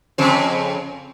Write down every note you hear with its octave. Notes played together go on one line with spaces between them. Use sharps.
F2 C#3 C5